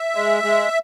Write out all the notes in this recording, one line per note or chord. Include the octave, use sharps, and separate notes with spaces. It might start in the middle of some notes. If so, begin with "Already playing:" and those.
Already playing: E5
G#3
G#3